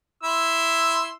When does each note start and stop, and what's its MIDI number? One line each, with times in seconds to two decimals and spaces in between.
0.23 1.12 64
0.23 1.12 84
0.23 1.12 88